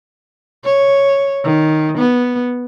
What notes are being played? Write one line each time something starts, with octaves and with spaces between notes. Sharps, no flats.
C#5
D#3
B3